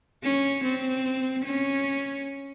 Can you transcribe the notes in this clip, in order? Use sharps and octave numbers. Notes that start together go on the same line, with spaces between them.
C#4
C4
C#4